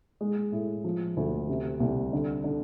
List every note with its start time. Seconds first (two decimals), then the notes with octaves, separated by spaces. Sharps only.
0.21 G#3
0.52 A2
0.84 F3
1.17 D2
1.49 C3
1.80 C2
2.13 D3
2.44 D3